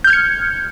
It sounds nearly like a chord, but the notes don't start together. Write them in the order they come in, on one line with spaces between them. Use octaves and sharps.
G6 F6 G#6 C#7